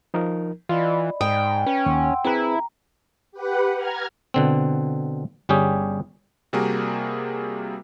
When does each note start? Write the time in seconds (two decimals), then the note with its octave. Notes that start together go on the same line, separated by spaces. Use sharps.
0.14 F3 D#4 A#4
0.69 E3 F4 D5 D#5 B5
1.21 G#2 G5 D#6
1.66 C#4 B4
1.86 D#2 F#5 C6 E6
2.24 C4 E4 G#4 B4 A#5
3.32 G4 B4 F#5
3.75 A#5 F6 G#6
4.34 B2 D3 C4
5.49 G1 G3 C#4 G4 G#4
6.53 C3 G3 A#3 F#4 G#4 A#4